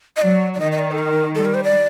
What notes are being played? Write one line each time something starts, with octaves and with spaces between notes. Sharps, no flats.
D#5
F#3 D5
D5
D#3 D#5
D#5
D5
A4
A#4
G3 A4
A#4
C5
D5